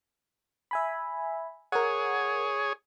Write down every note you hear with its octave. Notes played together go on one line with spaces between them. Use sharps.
E5 G#5 B5
G#4 A#4 C#5 F#5